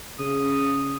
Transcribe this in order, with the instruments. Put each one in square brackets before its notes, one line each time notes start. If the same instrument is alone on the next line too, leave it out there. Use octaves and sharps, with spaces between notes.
[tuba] C#3 [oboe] D#6